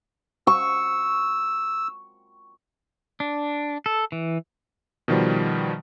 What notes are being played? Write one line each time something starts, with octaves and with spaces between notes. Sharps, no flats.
C#6 E6
D4
A4
E3
B2 D#3 F3 G3